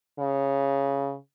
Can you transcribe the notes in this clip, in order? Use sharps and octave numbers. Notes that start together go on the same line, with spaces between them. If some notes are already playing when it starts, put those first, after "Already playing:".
C#3